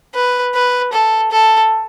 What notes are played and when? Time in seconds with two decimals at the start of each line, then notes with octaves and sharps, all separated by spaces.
0.15 B4
0.55 B4
0.93 A4
1.32 A4